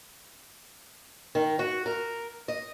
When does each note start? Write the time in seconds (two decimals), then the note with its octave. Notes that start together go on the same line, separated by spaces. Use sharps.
1.35 D#3
1.59 F#4
1.86 A#4
2.48 D#5